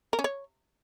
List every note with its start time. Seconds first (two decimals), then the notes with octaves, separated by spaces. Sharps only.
0.13 A#4
0.19 C#4
0.24 C#5